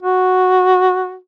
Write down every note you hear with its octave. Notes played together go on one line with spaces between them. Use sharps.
F#4